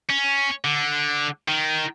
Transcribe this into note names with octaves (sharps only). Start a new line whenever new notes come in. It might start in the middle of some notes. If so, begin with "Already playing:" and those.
C#4
D3
D#3